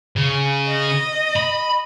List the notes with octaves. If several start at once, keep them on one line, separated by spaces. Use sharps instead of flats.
C#3
D#5
B5